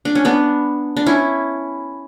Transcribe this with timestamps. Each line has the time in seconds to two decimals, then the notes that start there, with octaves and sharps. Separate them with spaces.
0.05 D4
0.15 C#4
0.25 B3 D4
0.97 D4
1.06 C#4 E4